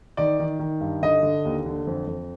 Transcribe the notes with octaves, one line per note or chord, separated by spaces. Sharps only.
D#3 D5
D#3
D#3
G2
D3 D#5
D3
D#2
D3
F2
F2